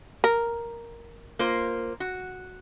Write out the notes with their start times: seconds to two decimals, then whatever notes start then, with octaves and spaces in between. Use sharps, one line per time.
0.24 A#4
1.39 A#3 F4 C5
2.00 F#4